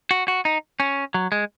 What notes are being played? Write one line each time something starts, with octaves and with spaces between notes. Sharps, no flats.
F#4
F#4
D#4
C#4
F#3
G#3